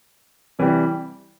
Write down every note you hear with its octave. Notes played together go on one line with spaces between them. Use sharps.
C3 E3 G3